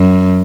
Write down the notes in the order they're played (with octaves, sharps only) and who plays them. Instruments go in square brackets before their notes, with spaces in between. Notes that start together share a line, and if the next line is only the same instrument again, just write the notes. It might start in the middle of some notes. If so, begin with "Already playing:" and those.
Already playing: [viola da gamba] F#2